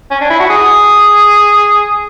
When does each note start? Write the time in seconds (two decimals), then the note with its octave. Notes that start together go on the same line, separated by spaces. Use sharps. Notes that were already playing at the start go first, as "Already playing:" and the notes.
0.11 C#4
0.21 D4
0.30 E4
0.40 F#4
0.50 G#4